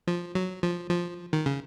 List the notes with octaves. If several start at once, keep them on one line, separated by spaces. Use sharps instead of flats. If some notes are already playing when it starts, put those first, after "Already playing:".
F3
F#3
F3
F3
D#3
C#3